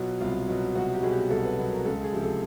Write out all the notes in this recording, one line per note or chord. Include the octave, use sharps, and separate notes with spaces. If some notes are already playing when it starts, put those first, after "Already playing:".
Already playing: B2 F#3 F4
C2 F4
B2 F#3
C2 F#4
G4
B2 F#3 G#4
G4
C2 A4
B4
B2 F#3
A#4
C#2 A4
G#4
C3 F3
A4